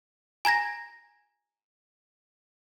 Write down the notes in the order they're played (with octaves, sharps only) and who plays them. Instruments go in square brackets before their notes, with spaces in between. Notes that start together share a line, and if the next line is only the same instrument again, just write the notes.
[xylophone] G#5 A#5 G#6 A#6